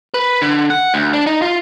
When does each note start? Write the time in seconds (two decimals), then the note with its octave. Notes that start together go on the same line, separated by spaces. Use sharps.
0.14 B4
0.42 D3
0.70 F#5
0.94 D2
1.14 D4
1.26 D#4
1.42 F4